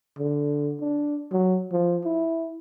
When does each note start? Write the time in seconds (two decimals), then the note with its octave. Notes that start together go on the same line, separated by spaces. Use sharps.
0.19 D3
0.81 D4
1.32 F#3
1.72 F3
2.05 E4